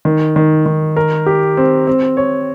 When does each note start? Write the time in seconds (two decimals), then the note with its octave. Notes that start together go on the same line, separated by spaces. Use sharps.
0.05 D#3
0.36 D#3
0.66 D#3
0.97 A#4
1.26 G4
1.57 C4
1.87 C4
2.17 C#5